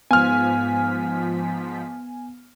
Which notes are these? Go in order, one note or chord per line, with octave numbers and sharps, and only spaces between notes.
G#2 F3 B3 G#5 F6 B6